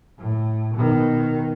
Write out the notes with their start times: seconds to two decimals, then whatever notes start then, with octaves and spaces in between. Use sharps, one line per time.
0.18 A2
0.74 B2 D#3